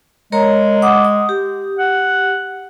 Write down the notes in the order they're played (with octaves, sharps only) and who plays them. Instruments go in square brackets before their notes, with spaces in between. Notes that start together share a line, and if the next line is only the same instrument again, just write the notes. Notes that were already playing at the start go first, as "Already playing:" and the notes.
[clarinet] G#3 [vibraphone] A#4 C#5 A#5
[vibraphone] F#5 D6 D#6
D#6
G4
[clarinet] F#5